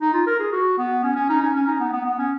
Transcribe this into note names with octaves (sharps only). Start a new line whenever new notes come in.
D#4
F4
A#4
G#4
F#4
B3
C#4
C#4
D#4
C#4
C#4
D#4
B3
B3
B3
C#4